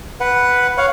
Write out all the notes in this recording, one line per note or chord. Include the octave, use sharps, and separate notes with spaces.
B4 F#5
C#5 F5 F#5